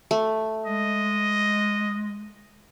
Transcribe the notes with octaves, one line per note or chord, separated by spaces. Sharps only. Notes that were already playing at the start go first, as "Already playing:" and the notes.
A3
G#3 D#5